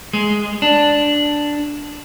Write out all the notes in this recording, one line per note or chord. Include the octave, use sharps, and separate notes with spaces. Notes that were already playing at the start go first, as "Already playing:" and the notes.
G#3
D4